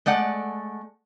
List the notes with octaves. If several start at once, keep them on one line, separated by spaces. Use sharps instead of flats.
G#3 A3 D5 F#5